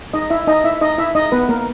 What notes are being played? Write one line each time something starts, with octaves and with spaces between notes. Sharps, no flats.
D#4 D#5
E4 E5
D#4 D#5
E4 E5
D#4 D#5
E4 E5
D#4 D#5
B3 B4
A#3 A#4